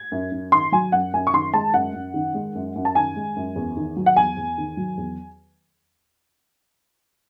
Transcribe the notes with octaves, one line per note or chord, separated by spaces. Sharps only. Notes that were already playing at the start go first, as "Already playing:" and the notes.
Already playing: G#6
F#2
F#2
D#3 C6
F#3 G#5
F#2 F#5
F#2 G#5
C#6
D#3 C6
G#3 A5
F#2 F#5
F#2
D#3
G#3
F#2
F#2
A5
D#3 G#5
G#3
F#2
E2
D#3
F#3
F#5
E2 G#5
E2
D#3
F#3
E2